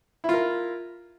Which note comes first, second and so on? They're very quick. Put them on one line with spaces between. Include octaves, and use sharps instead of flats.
E4 F4 A#4